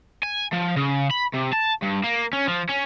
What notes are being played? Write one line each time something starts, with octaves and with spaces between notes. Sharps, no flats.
G#5
F3
C#3
B5
C3
A5
G2
A#3
C#4
F3
C#4